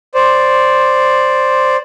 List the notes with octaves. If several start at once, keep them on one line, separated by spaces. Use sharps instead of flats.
C5 D5